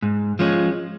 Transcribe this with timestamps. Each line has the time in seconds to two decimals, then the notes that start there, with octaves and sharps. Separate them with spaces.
0.02 G#2
0.39 F3 G#3 C#4